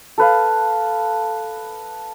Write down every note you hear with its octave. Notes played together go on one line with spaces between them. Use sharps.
A4 B4 F5